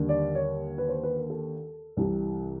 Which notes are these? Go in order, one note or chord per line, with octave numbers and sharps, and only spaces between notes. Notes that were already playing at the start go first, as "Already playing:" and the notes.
Already playing: D#2 D3 G3
D5
C#5
B4
C5
B4
A#4
A4
C2 C3 E3